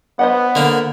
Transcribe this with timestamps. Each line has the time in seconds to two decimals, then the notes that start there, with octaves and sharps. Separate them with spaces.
0.19 B3 C5 D#5 F#5
0.55 D3 A#3